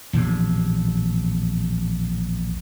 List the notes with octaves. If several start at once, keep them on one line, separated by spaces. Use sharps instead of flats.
A#1 E2 A2 C3